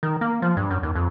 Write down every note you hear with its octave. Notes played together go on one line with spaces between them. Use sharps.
D#3
A#3
F3
G2
F#2
D#2
F2